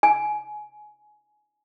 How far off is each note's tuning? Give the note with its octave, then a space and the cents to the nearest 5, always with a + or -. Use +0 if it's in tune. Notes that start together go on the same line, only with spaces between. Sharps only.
G#5 +15